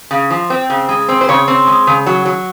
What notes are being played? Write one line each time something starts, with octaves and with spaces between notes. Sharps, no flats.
C#3
F3
C4
C#3
G#3
C4
C5
C#3 C#5
C4
G#3
C#3
F#3
F#3